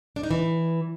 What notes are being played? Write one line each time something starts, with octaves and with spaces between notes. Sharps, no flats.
D4
D#4
E3